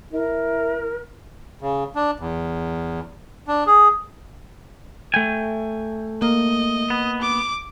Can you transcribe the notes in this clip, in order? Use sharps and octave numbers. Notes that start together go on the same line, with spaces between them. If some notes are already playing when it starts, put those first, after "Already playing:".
E4 A#4
C#3
D4
E2
D4
G#4
A3 G5 G#5
A#3 D#5
B3
D6